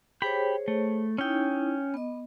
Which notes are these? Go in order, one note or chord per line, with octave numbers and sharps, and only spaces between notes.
G4 G#4 C5 C#5 B5
A3
C#4 D#4 E4 G5
B3 D#5